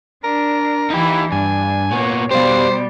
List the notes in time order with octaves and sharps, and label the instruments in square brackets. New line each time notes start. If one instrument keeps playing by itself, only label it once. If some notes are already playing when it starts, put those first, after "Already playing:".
[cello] D4 [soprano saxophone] A#4
[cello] E3 E4 [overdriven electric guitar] D#4 G4
[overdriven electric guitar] G2 [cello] D4 [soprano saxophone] G#5
[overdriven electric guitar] A#2 B3 [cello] A#3 C#5
[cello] B2 G3 [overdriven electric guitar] G4 F5 [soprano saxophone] C5